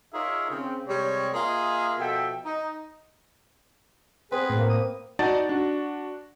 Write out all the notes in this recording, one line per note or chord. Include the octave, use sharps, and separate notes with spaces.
D#4 F4 G#4 A#4 C#5 E5
C#3 C4
C3 G3 G#3 C#5
A#3 F4 G#4 D#5 E5 G#5
B2 F3 A4 E5 G5
D#4
B3 C4 G#4 B4
A2 A#3
D#6
D#4 F#4 D5 F#5 A5 A6
D4 F#4